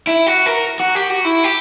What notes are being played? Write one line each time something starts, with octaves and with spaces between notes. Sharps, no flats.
E4
F#4
A#4
F#4
G4
F#4
E4
G4